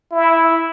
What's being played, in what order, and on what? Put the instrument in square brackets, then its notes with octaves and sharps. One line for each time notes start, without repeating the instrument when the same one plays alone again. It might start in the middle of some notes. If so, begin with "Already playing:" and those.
[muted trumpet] E4